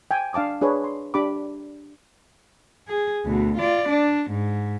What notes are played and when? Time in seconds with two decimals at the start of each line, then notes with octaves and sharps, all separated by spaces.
0.11 G5 G#5
0.33 D4 F5 A5 D6 D#6
0.61 D4 G#4 B4 C#5
0.84 C6
1.14 D4 G4 B5 D6
2.88 G#4
3.25 D2 B2
3.58 F4 D5
3.89 D4
4.31 G#2